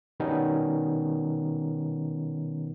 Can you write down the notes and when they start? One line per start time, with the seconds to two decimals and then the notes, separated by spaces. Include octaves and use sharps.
0.20 B2 D#3 G3 B3 C#4 D#4